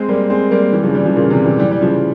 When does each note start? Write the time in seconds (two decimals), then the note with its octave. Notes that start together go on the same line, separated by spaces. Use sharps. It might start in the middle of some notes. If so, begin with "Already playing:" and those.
Already playing: G#3 C4
0.09 G3 A#3
0.30 G#3 C4
0.51 G3 A#3
0.72 E3 G3
0.83 C#3 F3
0.95 E3 G3
1.05 C#3 F3
1.16 A#2 C#3
1.30 C3 E3
1.44 E3 G3
1.59 E3 G3
1.71 G3
1.81 C#3 F3